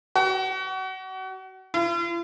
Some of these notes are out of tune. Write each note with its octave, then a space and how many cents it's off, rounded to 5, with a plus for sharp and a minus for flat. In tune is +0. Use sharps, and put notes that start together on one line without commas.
F#4 +30
F4 -45